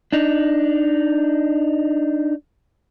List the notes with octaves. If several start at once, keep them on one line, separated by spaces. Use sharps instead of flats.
D4 D#4